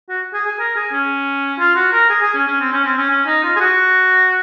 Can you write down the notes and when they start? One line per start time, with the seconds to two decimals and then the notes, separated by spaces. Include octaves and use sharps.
0.09 F#4
0.34 G#4
0.47 G#4
0.59 A#4
0.76 G#4
0.92 C#4
1.59 F4
1.76 F#4
1.93 A#4
2.10 G#4
2.22 G#4
2.35 C#4
2.47 C#4
2.60 C4
2.73 C#4
2.85 C4
2.98 C#4
3.10 C#4
3.26 D#4
3.44 F4
3.56 G#4
3.60 F#4